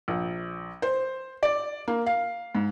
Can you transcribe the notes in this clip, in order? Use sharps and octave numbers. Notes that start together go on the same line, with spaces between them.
A#1
C5
D5
A#3
F5
G#2